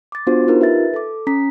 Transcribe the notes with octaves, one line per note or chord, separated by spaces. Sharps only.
D6 A6
B3 D4 F4 F#4 C5
D#4 F4 G4 A#4
B4 E5 A6
A4 D6
C#4 A#5 B6